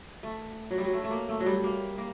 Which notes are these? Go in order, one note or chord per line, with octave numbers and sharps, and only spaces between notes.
A3
F#3
G3
F#3
A3
A3
A#3
A3
F#3
G3
A#3
A#3